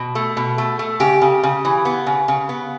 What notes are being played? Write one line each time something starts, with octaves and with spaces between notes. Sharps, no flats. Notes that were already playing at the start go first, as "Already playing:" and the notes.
Already playing: B2
A3
B2
A3
A3
C#3 G4
C#3
C#3
E3
B3
C#3
C#3
B3